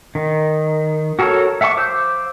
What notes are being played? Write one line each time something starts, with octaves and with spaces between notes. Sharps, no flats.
D#3
F#4 A4 A#4 C#5
E5 F#5 A5 C#6 D6
C5 F5 D6 E6 G6